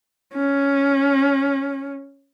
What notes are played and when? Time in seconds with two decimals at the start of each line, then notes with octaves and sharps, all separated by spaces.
0.35 C#4